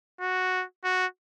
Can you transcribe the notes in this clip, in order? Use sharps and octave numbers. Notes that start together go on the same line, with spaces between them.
F#4
F#4